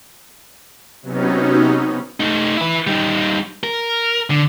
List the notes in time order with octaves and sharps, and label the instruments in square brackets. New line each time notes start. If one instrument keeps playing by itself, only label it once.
[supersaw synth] C3 F#3 B3 C#4 D#4
[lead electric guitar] A3 D#4
E4 B4
G3 D#4
A#4
D3